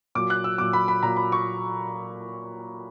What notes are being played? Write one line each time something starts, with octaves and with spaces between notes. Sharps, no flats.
A#2 F#3 D6
F#6
E6
A#2 F#3 D6
B5
B5
A#2 F#3 A#5
B5
C#6